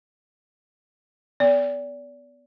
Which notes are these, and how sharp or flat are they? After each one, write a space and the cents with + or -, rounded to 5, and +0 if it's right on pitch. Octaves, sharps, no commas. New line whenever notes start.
B3 +20 D5 -35